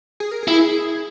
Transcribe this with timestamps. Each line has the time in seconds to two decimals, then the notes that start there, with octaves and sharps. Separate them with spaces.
0.20 G#4
0.31 A#4
0.43 E4 G#4
0.61 G#4